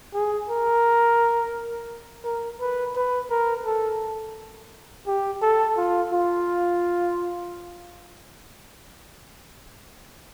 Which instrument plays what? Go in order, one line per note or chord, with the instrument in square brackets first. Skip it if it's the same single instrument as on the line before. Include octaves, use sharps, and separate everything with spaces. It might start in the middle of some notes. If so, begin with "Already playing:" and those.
[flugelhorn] G#4
A#4
A#4
B4
B4
A#4
A4
G4
A4
F4
F4